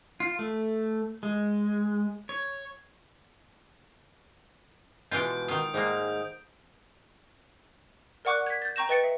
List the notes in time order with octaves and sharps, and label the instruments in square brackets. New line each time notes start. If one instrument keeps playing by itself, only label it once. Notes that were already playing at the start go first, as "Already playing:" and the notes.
[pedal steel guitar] F4
A3
G#3
C#5
[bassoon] B2 [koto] E3 G#3 F4 [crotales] G6 D7
[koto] D#3 F4 [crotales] D#6
[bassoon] G#2 [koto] G3 G#3 A#3
[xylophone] A#4 D5 F#5 C#6 D6 F#6
G#6 B6
G6 A6
G5 A#5 C#6 G6 A#6 E7
B4 D#5 G5 A6 C#7
E5